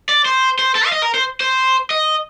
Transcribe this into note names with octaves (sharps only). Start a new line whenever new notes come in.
D5
C5
C5
A4
F5
D#5
A#4
C5
C5
D#5